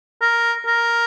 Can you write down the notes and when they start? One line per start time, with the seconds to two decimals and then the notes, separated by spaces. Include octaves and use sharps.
0.21 A#4
0.67 A#4